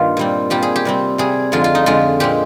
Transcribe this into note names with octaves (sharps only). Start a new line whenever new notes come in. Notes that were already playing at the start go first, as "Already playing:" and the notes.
Already playing: G2 D#3 A#3 F4
A#2 G3 C4
A#2 G3 C4 G4
G#4
G4
C3 G3 C4
C3 G3 C4 G#4
F2 D3 G#3 F4
F4
D#4
F2 D3 G#3 F4
A#2 G#3 C4 G4